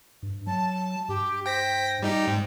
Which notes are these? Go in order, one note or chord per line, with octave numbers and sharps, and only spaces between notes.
G2
F#3 A5
G2 G4
C5 G5 A#6 B6
G3 D#4 G4
G#2 G5